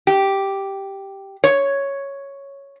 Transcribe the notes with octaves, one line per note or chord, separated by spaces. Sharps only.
G4
C#5